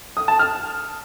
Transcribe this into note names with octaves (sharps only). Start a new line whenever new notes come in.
D#6
A5
F6